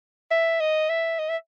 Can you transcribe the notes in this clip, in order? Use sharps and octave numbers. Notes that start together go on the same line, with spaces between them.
E5
D#5
E5
D#5
E5